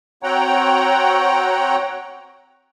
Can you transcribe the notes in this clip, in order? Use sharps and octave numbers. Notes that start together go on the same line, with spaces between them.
C4 F#4 C#5 F#5 G5 A#5